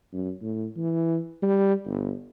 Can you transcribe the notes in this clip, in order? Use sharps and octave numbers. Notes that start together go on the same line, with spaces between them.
F#2
A2
E3
G3
G1